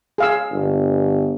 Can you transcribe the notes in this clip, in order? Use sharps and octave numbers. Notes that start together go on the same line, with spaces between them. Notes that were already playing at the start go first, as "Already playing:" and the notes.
G#4 F5 E6
G1